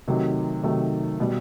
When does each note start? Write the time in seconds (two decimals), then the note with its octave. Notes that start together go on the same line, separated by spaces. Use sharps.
0.08 C3 D#3 F#3 A3 D#4
0.63 C3 D#3 F#3 A3 D#4
1.20 B2 G3